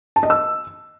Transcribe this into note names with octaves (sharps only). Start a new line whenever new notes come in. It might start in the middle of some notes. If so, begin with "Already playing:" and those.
A5
D#5
E6